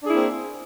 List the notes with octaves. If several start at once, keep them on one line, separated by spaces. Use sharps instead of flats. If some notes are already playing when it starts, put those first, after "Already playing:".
A#3 C4 D4 E4 G#4